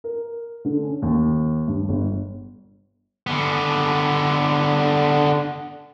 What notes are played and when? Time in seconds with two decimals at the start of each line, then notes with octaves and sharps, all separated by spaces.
0.04 A#4
0.65 D3
0.83 C#4
1.02 D#2
1.67 G2
1.89 G1
3.27 D3 B3